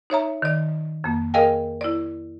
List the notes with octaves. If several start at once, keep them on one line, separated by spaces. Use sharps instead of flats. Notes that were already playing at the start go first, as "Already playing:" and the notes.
D#4 C#5 E5 A#5
D#3 D5
F2 A#3
G#4 A#4 D#5 F5 G5 G#5
E4 D5